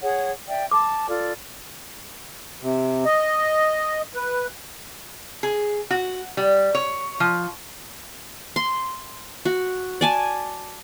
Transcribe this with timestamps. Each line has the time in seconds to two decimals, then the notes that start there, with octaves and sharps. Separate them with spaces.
0.02 G#4 C#5 F#5
0.49 D5 E5 G5
0.71 A5 D6
1.08 F4 A4 D5
2.62 C3
3.05 D#5
4.15 B4
5.43 G#4
5.91 F#4
6.37 G3
6.75 C#5
7.20 F3
8.56 C6
9.45 F#4
10.01 D5 G#5 A5